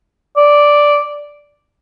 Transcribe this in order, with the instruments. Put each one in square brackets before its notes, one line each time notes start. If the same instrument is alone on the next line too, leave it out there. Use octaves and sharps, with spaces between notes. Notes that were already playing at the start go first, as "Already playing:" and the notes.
[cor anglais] D5